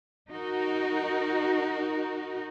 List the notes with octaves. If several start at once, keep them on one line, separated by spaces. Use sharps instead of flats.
D#4 F#4 A#4